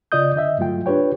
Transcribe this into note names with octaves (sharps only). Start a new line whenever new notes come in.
C#3 F4 D5 D#5 D#6 G6
D3 D#5 E5
G2 F#3 A3 F4 G5
D4 F4 G4 B4 C#5 G5